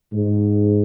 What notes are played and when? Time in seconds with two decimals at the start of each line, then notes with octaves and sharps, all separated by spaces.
0.13 G#2